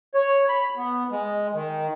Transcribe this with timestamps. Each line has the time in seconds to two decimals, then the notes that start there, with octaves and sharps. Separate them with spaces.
0.14 C#5
0.49 B5
0.77 B3
1.11 G#3
1.54 D#3